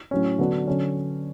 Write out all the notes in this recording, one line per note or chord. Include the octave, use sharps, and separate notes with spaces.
A2 F#3 C#4
D3 F#3 B3 D4 F#4
D3 F#3 C#4